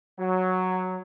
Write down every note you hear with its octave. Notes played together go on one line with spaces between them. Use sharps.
F#3